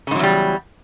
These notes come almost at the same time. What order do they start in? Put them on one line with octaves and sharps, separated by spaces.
C#3 G#2 F#3 E2 G3